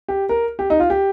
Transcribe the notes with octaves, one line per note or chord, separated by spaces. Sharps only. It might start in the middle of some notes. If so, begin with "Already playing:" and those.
G4
A#4
G4
D#4
F4
G4